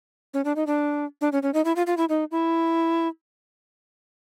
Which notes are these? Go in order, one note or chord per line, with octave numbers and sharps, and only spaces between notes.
C#4
D4
D#4
D4
D4
C#4
C#4
D#4
E4
F4
F4
E4
D#4
E4